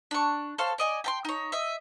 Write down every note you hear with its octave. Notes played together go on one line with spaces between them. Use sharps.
D4 C#6
A4 C5 C#5 F5
D5 D#5 G#5
G5 A5 C6
D#4 C#5
D#5 E5